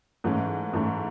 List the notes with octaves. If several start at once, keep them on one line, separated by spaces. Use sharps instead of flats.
G#2 E3 A3 C#4
G#2 E3 A3 C#4